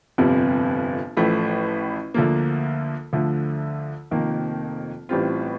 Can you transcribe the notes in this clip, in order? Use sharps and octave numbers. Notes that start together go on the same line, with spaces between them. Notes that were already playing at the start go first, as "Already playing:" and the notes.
G1 F2 C3 G3
A1 A2 F3 A3
D2 D3 F3 A#3
D2 D3 F3 A3
F1 F2 D#3 A#3
A1 A2 G3 C4 F4